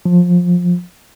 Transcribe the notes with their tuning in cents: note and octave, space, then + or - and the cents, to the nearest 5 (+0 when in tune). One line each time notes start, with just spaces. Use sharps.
F3 +20